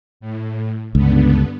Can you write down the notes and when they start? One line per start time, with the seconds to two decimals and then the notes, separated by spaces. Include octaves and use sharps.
0.20 A2
0.95 C#2 G2 D3 B3